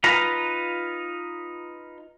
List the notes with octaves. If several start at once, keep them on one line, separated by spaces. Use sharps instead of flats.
D#4 F4 B4 A#5